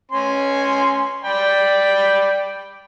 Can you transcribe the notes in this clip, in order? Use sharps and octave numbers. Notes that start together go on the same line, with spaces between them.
C#4 G#5 C6
D5 G5 B5